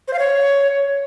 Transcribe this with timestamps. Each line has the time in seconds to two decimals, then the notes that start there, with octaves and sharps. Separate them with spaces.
0.08 C5
0.13 F5
0.19 C#5